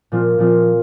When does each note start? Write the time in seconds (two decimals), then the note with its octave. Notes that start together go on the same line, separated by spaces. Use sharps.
0.12 A#2 F3 C4 F4
0.39 A#2 F3 C4 F4